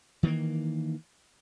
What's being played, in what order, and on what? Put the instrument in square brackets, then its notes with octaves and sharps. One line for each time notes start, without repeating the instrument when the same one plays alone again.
[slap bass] D#3 E3 A3 A#3